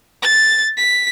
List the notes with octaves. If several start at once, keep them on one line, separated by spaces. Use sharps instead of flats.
A6
B6